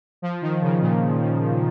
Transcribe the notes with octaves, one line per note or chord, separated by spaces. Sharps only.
F3
D#3
C#3
A#2